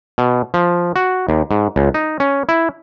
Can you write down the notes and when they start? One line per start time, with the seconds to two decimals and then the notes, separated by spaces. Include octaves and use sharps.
0.18 B2
0.54 F3
0.96 F#4
1.29 D#2
1.51 G#2
1.76 C#2
1.94 D#4
2.20 C#4
2.49 E4